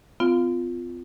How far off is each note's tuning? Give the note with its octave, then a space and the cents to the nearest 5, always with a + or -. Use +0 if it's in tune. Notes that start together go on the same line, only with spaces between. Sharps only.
C4 -45 F4 +0 F5 +0